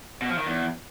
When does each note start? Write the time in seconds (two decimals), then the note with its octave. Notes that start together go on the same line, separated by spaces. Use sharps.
0.22 B2
0.30 F3
0.38 D#3
0.47 E2